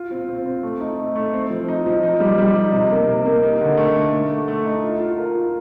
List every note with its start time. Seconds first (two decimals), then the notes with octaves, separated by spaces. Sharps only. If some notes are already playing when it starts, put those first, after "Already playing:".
Already playing: F4
0.11 C4
0.29 C4
0.46 C4
0.63 A3
0.80 D#4
0.99 A3
1.15 A3
1.33 C4
1.50 F3
1.68 D#4
1.86 F3
2.03 D#4
2.20 G3
2.38 G3
2.56 D#4
2.72 C3
2.90 A#3
3.07 C3
3.26 A#3
3.43 D#4
3.61 D3
3.77 A3
3.96 D3
4.13 A3
4.30 A3
4.48 A3
4.65 D#4
4.83 F4
5.00 F4
5.18 A#4
5.35 F4